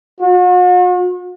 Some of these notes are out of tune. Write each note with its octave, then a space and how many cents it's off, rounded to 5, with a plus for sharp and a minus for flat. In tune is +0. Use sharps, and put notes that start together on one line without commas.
F#4 -45